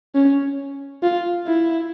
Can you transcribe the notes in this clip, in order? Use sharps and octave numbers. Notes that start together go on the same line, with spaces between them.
C#4
F4
E4